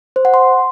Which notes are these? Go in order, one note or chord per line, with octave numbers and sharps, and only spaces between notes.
C5
F#5
C6